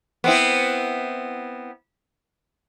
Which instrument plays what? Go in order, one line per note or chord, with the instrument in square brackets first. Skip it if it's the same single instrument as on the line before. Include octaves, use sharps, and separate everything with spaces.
[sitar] B3 C4 E4